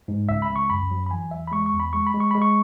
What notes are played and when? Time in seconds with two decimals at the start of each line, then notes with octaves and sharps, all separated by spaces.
0.08 G#2
0.29 C#2 E5
0.42 B5
0.50 C#2
0.56 C#6
0.70 F#2 B5
0.91 F#3
1.06 B5
1.10 E3 G#5
1.31 E2 E5
1.47 B5
1.52 G#3 C#6
1.66 C#6
1.73 E2
1.80 B5
1.93 G#3 C#6
2.07 B5
2.14 G#3
2.20 C#6
2.31 G#3 B5
2.42 C#6